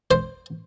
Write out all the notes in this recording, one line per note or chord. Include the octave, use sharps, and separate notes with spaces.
C5